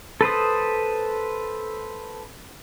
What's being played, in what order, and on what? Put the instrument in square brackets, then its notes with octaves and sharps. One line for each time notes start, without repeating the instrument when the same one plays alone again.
[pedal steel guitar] A4 B4 C5 D#6